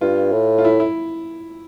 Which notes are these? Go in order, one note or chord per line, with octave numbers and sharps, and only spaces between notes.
G2 F4
A2
F4
E4
E4